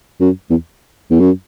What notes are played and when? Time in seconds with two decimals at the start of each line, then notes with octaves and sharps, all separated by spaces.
0.20 F#2
0.50 E2
1.11 E2
1.20 F#2